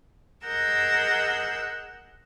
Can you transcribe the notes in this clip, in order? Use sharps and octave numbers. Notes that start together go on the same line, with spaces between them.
G#4 A#4 D#5 F#5 E6 G6